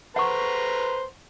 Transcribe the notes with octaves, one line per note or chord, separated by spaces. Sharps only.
B4 C5 F#5 A#5 C#6